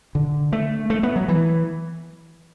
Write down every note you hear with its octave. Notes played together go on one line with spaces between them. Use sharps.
D3
A3
A3
B3
F#3
E3